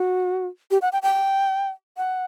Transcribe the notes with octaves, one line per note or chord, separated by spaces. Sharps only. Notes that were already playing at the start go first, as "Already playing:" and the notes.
Already playing: F#4
G4
F#5
G5
G5
F#5